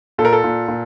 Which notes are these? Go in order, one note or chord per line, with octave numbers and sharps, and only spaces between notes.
A#2 A4
A#4
A4
A#2
A#2